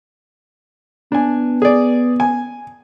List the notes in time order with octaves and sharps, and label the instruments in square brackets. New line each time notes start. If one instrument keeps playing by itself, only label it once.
[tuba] B3 [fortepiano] D4 G#5
[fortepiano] G#4 D5
G#5